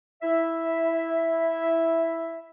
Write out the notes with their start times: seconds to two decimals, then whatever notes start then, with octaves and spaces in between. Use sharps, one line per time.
0.23 E4 E5